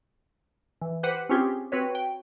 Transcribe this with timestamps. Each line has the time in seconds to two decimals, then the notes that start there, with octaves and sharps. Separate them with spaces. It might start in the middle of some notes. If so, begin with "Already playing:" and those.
0.81 E3
1.03 G4 B4 C5 F#5
1.29 C4 C#4 F4 G4 G#4
1.72 C4 F#4 B4 C#5
1.95 G5